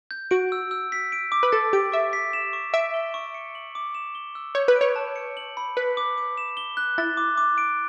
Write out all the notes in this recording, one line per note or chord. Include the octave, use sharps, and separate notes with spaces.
G6
F#4 D7
E6
E6
B6
D7
D6
B4
A4 A6
G4 D7
E5 C#6
B6
E7
C#6
E5 D7
G7
C#6
C#7
F#7
D6
E7
G7
E6
C#5 G6
B4
C#5 D7
A5
C#7
F#7
B5
B4 B6
D6
D6
E7
G7
F#6
E4 A6
D6
D6
D7